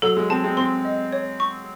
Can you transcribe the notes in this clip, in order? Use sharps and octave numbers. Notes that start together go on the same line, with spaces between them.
F#3 A4
G#3
G#3 C4 A5
G#3 C4
G#3 C4 C6
D#5
C#5
C#6